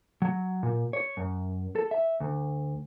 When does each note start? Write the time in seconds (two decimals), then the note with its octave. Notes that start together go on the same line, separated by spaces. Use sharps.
0.22 F#3
0.63 A#2
0.93 C#5
1.17 F#2
1.76 A4
1.91 E5
2.20 D2